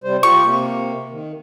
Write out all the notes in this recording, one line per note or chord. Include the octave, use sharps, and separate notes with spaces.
C3 G3 C5
F4 G4 C#6
C3 A#3
D#3